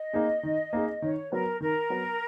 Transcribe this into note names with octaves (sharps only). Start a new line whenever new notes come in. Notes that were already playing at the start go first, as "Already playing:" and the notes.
Already playing: D#5
A#3 D#4 G#4
D#3
A#3 D#4 G#4
D#3 C#5
F#3 B3 A#4
D#3 A#4
F#3 B3